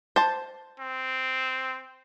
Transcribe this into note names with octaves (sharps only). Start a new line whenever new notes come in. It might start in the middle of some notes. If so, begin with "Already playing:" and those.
C5 A5
C4